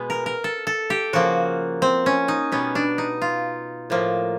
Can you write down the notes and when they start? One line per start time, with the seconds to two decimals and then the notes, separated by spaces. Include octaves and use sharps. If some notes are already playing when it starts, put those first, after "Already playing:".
Already playing: B2 G#3 B3
0.10 A#4
0.26 A#4
0.44 A4
0.67 A4
0.90 G4
1.13 C#3 F3 A#3 F#4
1.82 C4
2.06 C#4
2.28 D#4
2.52 B2 G3 B3 C#4
2.75 D4
2.98 D#4
3.22 F4
3.90 A2 F3 A#3